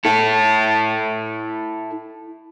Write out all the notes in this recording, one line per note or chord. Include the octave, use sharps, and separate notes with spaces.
E4 A4